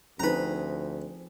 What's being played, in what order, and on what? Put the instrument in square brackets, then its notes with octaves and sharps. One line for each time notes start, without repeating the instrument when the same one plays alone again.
[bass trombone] D2 [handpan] F3 C4 G#4 [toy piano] C#4 D#4 [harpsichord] B4 A#5